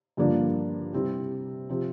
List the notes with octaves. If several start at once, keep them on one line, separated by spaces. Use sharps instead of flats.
G2 D3 F3 A#3 D4
C3 G3 C4 E4
C3 F3 C4